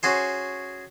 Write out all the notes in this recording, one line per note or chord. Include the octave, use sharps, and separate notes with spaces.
C#4 F#4 G#4 C5